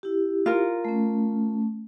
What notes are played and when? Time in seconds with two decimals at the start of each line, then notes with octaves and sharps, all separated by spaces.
0.03 E4 G4
0.46 F4 A#4
0.85 A3 C#4